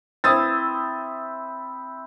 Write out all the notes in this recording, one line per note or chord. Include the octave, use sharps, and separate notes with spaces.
C4 E4 D#6 E6 A6